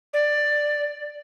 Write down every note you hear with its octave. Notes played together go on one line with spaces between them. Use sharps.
D5